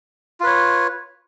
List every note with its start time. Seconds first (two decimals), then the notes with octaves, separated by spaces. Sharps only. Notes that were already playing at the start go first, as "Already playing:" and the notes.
0.40 F4
0.43 B4
0.46 C#5